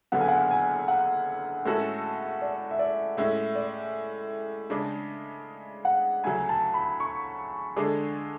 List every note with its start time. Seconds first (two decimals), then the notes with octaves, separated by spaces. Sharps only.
0.12 F#1 F#2 D3 F#3 B3 F#5
0.21 G#5
0.28 F#5
0.51 G#5
0.88 F#5
1.65 A2 G#3 C#4 F#4 A4
2.42 D5
2.71 E5
2.79 D5
3.17 A2 G#3 C#4 E5
3.55 D5
4.70 C#3 G#3 D4
5.85 F#5
6.24 D2 C#3 F#3 G#5
6.49 A5
6.74 B5
7.00 C#6
7.76 D3 G#3 D4 G#4